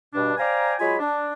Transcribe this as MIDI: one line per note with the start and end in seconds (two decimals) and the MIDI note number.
0.13 0.33 43
0.13 0.33 47
0.13 0.33 62
0.38 0.74 72
0.38 0.74 74
0.38 0.74 77
0.38 0.74 79
0.38 0.74 80
0.38 0.74 82
0.79 0.95 54
0.79 0.95 56
0.79 0.95 65
0.79 0.95 68
0.79 0.95 80
0.79 0.95 83
0.99 1.32 62